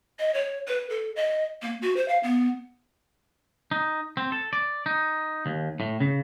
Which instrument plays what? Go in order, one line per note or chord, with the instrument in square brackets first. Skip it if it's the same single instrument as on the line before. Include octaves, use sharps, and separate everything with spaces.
[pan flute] D#5
C#5
B4
A4
D#5
A#3
F#4
C5
F5
B3
[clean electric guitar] D#4
C4
A4
D5
D#4
D#2
A2
C#3